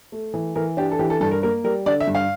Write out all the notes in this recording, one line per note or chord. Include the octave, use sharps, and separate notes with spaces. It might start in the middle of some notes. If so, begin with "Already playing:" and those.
A3
E3
E3 A#4
D4 G4
A4
E3 G4
A4
G2 A4
A#4
A#3 A#4
G3 A#4
D3 D5
E5
G2
F5